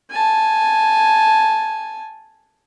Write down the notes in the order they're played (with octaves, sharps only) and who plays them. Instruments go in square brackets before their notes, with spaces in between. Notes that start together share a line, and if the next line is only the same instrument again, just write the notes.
[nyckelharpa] G#5 A5